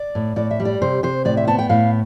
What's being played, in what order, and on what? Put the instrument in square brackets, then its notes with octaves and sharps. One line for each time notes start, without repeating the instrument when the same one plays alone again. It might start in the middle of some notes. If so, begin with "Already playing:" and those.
Already playing: [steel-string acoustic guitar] D5
A2
A2 D5
E5
G3
D5
C3 C5
C3 C5
A2 D5
E5
B3 A5
G5
A2 F5